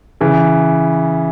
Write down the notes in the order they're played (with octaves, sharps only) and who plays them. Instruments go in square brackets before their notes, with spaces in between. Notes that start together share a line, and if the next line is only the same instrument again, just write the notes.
[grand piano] C#3 E3